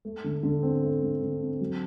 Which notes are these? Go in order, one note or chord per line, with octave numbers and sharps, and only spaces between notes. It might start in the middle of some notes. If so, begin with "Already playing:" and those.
A3
D3
D3
C4
A3
D3
D3
C4
F#3